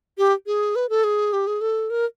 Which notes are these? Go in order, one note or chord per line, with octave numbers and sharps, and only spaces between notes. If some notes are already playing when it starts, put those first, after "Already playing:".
G4
G#4
B4
A4
G#4
G4
G#4
A4
A#4